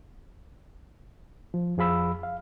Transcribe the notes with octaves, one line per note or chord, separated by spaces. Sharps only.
F3
F2 F3 G#4 F5 B5 E6
F5